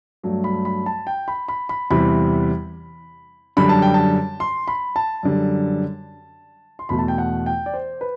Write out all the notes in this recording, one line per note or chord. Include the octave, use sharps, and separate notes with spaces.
G2 F#3 A3
B5
B5
A5
G5
B5
B5
B5
E2 C3 E3 G3 B5
F#2 D3 G3 B5
A5
G5
A5
C6
B5
A5
F#2 D3 G3
C6
E2 B2 A3 B5
A5
G5
F#5
G5
D5
C5
B4